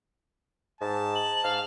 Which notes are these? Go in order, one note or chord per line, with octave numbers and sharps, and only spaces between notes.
G#2 A5
F#7
G#2 F5